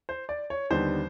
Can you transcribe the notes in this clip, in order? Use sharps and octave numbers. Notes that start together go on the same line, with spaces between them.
C5
D5
C#5
D#2 D3 G3 B3 D#4 C5